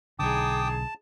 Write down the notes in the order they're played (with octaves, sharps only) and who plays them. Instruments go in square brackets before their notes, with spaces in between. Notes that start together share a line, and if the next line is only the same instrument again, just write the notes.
[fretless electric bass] B1 D3 [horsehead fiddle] D#4 G#4 [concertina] G5 D6 D#6 [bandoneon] A5